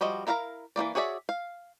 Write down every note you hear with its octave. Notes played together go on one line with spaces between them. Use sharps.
F3 G3 F#4 D#5
E4 A#4 F5 F#5 A#5
E3 F#3 A#3 D5
F#4 G#4 C#5 D5 E5
F5